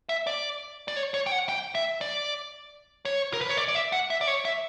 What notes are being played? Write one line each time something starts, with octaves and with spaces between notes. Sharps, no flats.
E5
D5
D5
C#5
C#5
G5
F#5
G5
E5
D5
C#5
A#4
B4
C#5
D5
D5
E5
F#5
E5
D5
C#5
E5